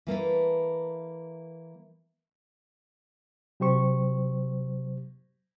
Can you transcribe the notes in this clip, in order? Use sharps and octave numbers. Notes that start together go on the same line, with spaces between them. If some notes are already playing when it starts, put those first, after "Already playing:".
E3 A#3 A4 B4
C3 F#3 G4 C5 C#6